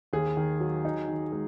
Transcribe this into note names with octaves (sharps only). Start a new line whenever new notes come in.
D#2 G#4
D#3
F#3
D#4
D#3
G#3